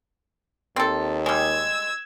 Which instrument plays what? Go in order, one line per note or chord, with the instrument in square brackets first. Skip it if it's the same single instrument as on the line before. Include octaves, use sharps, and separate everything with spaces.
[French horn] D#2 [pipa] C4 A4
[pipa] G3 G#3 [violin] E6 G#6